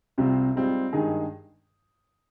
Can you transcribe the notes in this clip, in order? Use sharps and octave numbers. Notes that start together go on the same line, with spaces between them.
C2 C3 G3 C4 F4
G#2 G3 C4 F4
G2 D#3 G#3 D#4 G#4